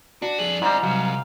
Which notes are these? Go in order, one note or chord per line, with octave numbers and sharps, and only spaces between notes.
D4 F#4
F2 G#4 F#7
G#2 G3 E4 D5 A#5
C2 F#3 F5